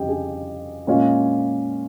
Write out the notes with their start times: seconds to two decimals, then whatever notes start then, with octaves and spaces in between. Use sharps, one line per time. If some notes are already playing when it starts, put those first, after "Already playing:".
Already playing: F2 C#3 G3 G4 D#5
0.09 G#4
0.87 A#2 G#3 C#4